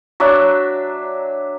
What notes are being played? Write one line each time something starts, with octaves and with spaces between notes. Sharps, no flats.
F#3 D4 E5